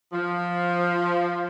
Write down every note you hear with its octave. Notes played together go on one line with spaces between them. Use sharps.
F3